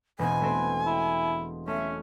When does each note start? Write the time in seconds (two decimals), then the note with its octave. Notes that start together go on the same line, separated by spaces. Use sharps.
0.19 E1 B2 C4 B4 G#5
0.41 A3 C4 C5
0.86 E4
1.67 A3 C#4 E5